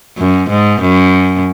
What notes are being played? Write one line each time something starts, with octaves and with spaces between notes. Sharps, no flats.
F#2
G#2
F#2